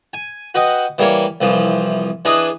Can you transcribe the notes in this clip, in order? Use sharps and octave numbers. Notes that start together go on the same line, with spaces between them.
G#5
F#4 B4 D#5 G5
E3 G3 A#3 A#4 C#5
C2 E3 F3
E3 D4 G#4 B4 D#5